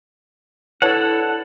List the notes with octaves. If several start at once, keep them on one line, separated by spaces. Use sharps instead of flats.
D3 D4 E4 A4 B4 C#5 F#5 A5